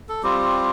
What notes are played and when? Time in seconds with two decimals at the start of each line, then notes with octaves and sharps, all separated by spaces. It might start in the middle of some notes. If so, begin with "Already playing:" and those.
0.09 A4
0.23 G3 C4 F4 G4